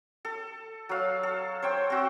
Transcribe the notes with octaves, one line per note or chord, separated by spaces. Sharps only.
A4
F#3 F5
A4
C5 C#5 G5
C4 F#4